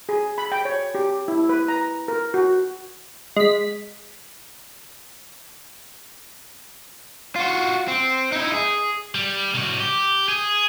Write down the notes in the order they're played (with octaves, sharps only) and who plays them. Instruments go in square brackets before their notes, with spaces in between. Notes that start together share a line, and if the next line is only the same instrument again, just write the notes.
[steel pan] G#4
B5
G5
C#5
G4
E4
B4
A#5
A#4
F#4
[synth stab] G#3 B6
[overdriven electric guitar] F4 F#4
C4
D#4 E4
G#4
[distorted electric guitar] G3
C2 F#4
G4
G#4